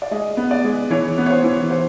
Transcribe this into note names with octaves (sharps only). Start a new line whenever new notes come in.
D5
G#3 D#5
B3
D5
G#3
E3 C#5
B3
C#5
C5
E3
C5